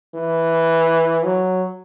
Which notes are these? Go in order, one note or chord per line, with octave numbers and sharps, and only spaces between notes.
E3
F#3